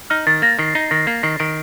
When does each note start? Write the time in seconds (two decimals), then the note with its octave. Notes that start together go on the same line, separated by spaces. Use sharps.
0.10 D#4 F6
0.27 D#3 A6
0.42 A#3 A#6
0.59 D#3 C7
0.75 D#4 C7
0.91 D#3 A#6
1.07 A#3 C7
1.23 D#3 C7
1.39 D#3 D7